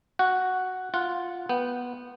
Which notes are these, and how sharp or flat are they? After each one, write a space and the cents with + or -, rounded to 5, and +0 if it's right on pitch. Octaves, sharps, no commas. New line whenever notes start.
F#4 +0 F#5 +0
F4 +0 F#5 -10
B3 -10 G5 -15